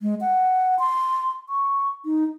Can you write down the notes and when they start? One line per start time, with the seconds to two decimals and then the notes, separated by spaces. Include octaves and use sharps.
0.02 G#3
0.21 F#5
0.79 C6
1.49 C#6
2.05 D#4